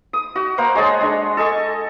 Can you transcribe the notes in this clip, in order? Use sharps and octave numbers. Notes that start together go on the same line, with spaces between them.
D#6
F#4
A#3 C5 F#5
G#3 C#5 D#5 A5
G#3 D4
A4 D#5 G#5 C#6